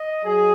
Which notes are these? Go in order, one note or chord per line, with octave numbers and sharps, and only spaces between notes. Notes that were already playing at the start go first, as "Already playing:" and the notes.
Already playing: D#5
F#3 G#4